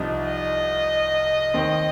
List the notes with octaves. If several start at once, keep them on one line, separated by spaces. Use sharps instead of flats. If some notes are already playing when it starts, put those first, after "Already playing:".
Already playing: C2 C3 F3 D#4
D#5
D#2 D#3 C4